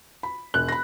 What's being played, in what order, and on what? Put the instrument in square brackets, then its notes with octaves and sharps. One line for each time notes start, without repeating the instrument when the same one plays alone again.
[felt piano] B5
[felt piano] E1 [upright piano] F#6
[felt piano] B5 A#6